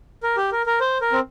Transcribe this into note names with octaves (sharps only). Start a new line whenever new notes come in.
A#4
G4
A#4
A#4
C5
A#4
C4